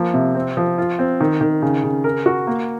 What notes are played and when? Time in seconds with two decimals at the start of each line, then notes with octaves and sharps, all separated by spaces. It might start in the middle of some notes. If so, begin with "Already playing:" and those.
Already playing: F3 A#3
0.14 C3
0.35 C4
0.57 F3
0.78 F4
0.99 C4
1.20 D#3
1.41 D#3
1.62 C#3
1.84 C#3
2.04 A#4
2.26 F#4
2.47 A#3